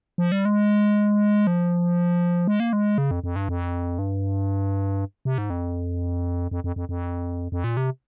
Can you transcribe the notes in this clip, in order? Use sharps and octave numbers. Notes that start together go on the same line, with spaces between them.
F3
G3
G#3
F3
G#3
A#3
G#3
C#3
F2
F2
G2
F2
G2
C3
G#2
F2
F2
F2
F2
F2
F2
A#2
C3